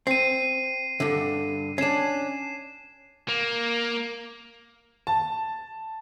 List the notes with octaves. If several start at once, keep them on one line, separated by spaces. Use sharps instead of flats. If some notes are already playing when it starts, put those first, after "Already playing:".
C4 C7 D#7
G2 D3
C#4 D4 C7 E7
A#3
A5